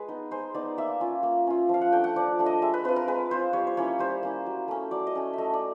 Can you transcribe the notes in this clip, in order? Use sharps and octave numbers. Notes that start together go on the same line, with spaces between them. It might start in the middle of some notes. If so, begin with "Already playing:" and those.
Already playing: G#3 B4
B3 D#4
G#3 C5
B3 D#4 D5
A#3 E5
C#4 F4
A#3
C#4 F4
F3 F5
F#5
A3 D4 G5
F#5
F3 D5
A3 D4
D#5
G#3 E5
B4
C4 F4 B4
A#4
G#3 B4
C4 F4 C5
G3 C#5
C5
A#3 C#4 E4 C#5
G3 C5
A#3 C#4 E4
F#3
A3 C#4
F#3 D5
D#5
A3 C#4
A3 D#5 E5
D5